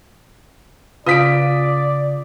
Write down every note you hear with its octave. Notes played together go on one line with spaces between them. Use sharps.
C#3 F4 B4 D5 F5 D#6 B6 D7